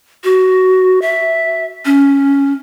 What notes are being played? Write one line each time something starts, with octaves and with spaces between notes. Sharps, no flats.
F#4
E5
C#4